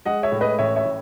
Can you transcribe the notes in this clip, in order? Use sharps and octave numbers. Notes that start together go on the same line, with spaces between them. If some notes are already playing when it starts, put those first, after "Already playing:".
G#3 D#5 F#5
C#5 E5
A2
B4 D#5
A1 C#5 E5
C#5 E5
A2